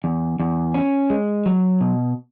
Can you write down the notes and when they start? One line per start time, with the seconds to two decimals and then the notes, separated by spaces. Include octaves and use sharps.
0.04 E2
0.40 E2
0.74 C#4
1.10 G#3
1.46 F#3
1.81 B2